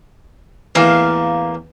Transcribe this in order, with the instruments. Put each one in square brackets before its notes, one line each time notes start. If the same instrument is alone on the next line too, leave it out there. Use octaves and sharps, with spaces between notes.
[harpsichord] E2 A2 [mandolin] A#3 F5